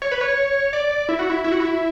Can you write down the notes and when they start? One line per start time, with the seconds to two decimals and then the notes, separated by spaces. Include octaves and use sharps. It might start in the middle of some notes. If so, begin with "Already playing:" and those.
0.02 C#5
0.12 B4
0.21 C#5
0.73 D5
1.09 E4
1.19 F#4
1.30 E4
1.44 E4
1.52 F#4
1.60 E4